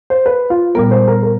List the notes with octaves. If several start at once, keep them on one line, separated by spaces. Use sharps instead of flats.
C5
B4
F4
A#2 G3 B3 A#4
C5
A#4
A#4